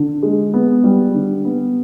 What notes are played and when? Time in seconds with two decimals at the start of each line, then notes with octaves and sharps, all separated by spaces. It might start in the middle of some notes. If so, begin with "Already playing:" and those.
Already playing: D3
0.23 G#3
0.54 B3
0.84 G3
1.14 D3
1.45 B3